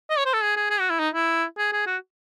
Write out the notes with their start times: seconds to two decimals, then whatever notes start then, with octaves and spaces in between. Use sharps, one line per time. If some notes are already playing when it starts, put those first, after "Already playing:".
0.10 D#5
0.18 C#5
0.25 C5
0.33 A4
0.42 G#4
0.56 G#4
0.70 G#4
0.80 F#4
0.90 E4
0.99 D#4
1.13 E4
1.58 G#4
1.72 G#4
1.86 F#4